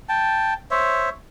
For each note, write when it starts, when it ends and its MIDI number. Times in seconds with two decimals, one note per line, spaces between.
0.09 0.54 79
0.09 0.54 81
0.71 1.09 72
0.71 1.09 73
0.71 1.09 76